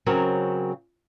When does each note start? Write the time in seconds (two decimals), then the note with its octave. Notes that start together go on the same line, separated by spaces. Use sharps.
0.06 C#3 F#3 C4 A#4 C#5